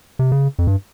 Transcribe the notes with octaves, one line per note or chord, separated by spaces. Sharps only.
C3
C#3
F2
G2